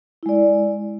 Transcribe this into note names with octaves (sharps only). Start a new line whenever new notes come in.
G#3 E4 D5